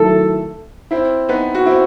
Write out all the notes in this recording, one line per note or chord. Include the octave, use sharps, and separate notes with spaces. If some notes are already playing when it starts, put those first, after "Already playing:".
Already playing: D#3 F#3 A3 E4 A4
C4 E4
B3 D#4
F#4
C4 E4